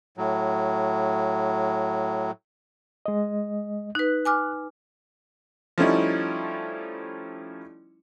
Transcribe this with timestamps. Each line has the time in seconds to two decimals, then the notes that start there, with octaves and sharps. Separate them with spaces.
0.17 A2 F#3
3.06 G#3 D#5
3.95 D#4 B4 F#6
4.25 G#5 D6 F6
5.78 F3 G3 A3 C#4 D#4 E4